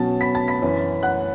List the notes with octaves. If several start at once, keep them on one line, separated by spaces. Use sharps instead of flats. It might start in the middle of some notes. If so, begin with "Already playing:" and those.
Already playing: B2 F#3 C#4 A5 A6
B5 B6
A5 A6
B5 B6
F#2 E3 C#4
F#5 F#6